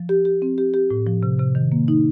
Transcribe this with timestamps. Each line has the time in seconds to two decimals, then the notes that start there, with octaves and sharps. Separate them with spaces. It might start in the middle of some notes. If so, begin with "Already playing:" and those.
Already playing: F3
0.09 G4
0.25 G4
0.42 C4
0.58 G4
0.74 G4
0.91 A2
1.07 F3
1.23 C3
1.39 C3
1.55 D#3
1.72 A#3
1.88 D#4